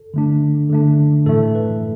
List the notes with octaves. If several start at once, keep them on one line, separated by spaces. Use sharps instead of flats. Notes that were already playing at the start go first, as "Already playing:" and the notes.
Already playing: A4
D3 A3 D4
D3 A3 D4
A2 E3 A3 A4
B4